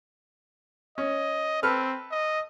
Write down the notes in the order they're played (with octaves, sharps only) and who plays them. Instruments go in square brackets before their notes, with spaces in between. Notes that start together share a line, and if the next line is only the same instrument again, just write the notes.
[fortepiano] C#4 [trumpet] D#5
[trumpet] C4 [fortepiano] A4 B4 F6
[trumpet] D#5